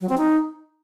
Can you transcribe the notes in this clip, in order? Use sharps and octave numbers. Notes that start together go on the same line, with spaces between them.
F#3
C4
D#4